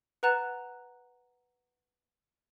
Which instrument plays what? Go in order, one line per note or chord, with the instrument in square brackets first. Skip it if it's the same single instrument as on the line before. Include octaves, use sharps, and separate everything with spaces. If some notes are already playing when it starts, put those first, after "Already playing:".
[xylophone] B4 F#5 A#5 F#6 A6 E7